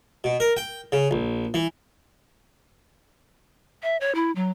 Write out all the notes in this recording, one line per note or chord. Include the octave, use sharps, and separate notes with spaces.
B2
A#4
G5
C#3
A#1
E3
E5
C#5
E4
F#3